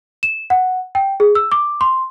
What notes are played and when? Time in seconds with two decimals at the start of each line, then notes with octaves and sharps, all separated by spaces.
0.23 E7
0.50 F#5
0.95 G5
1.20 G#4
1.35 E6
1.52 D6
1.81 C6